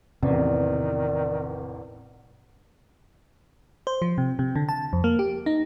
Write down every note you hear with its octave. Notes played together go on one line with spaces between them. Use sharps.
A1 E2 C3 D#3 D5
C5
F3
C3
C3
D3
A5
F2
A#3
G4
D#4